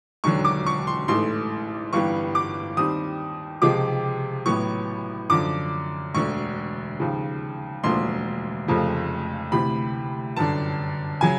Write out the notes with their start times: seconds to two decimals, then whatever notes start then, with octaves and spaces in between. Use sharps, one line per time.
0.24 E1 D#2 D3 F#3 C#6
0.45 D6
0.66 C#6
0.87 C6
1.08 A1 G#2 E3 A3 C6
1.92 G1 G2 E3 G3 B3 C#6
2.35 D6
2.77 D#2 D#3 G3 C4 D#6
3.62 C#2 C3 F3 G#3 C4 D6
4.46 A1 A2 F#3 B3 C#6
5.30 F#2 D3 F3 D6
6.14 E1 D2 D3 C#6
6.99 D#2 C#3 F3
7.84 E1 D2 D3 F3 A#3 C6
8.68 F1 F2 C#3 F3 A3
9.52 D2 C3 E3 B5
10.36 G1 F#2 D3 A5
11.21 C#3 F#3 G#5